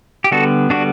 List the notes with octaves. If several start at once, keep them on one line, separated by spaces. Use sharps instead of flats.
G4
D3 G3 B3 F#4 A4
D3 G3 B3 D4 F#4